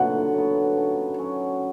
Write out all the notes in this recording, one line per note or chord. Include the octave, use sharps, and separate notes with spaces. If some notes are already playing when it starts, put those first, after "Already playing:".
Already playing: D3 F#3 B3 F#5
F#3 B3
C#3
F#3 C#4